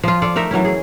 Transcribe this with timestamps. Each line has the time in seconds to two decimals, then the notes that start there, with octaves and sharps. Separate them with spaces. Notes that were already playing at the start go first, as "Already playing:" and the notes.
0.04 F3 F4
0.22 F4 A4 D5
0.36 A3 D#4 A#4 E5
0.51 E3 F#3 C#4 E4
0.65 G#4